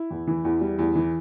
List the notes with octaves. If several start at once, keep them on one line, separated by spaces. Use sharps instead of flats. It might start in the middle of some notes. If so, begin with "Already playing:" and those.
Already playing: E4
E2
E3
E2
G3
E2
E3